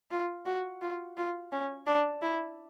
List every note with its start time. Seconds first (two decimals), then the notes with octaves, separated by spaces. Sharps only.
0.11 F4
0.46 F#4
0.81 F4
1.17 F4
1.52 C#4
1.86 D4
2.22 E4